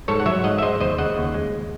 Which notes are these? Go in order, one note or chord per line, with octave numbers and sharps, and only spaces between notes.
G#2 A4 C#5
F#5
F#3 C#5 E5
G#2 D#5 F#5
E5
G#3 C5 D#5
D#2 C5 D#5
C#3 D#5 F#5
D#2
G#3